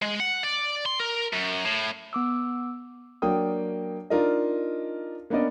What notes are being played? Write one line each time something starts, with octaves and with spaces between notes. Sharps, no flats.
G#3
F#5
D5
C6
A#4
F#2
A2
B3 D6 E6
F#3 A#3 D4 G5 D#6
D4 D#4 F4 A#4 D5 D#5
A#3 B3 C#4 D4 D5 D#5